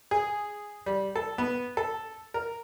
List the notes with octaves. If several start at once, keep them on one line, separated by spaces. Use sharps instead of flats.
G#4
G3
A4
B3
A4
A#4